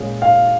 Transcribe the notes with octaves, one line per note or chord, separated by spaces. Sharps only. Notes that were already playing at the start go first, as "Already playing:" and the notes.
Already playing: A#2 G#3 C#4 G#4
F5